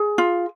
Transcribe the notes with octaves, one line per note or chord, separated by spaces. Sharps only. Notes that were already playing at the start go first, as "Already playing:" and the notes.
Already playing: G#4
F4